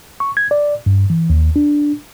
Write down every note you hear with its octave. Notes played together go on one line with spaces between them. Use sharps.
C#6
G#6
D5
G2
E3
D#2
D4